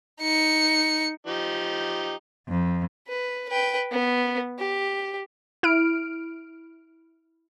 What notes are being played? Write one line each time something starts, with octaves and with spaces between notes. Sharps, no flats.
D#4 C#7
F3 D#4 G4
F2
B4
B4 G5
B3
G4
E4 F6 D7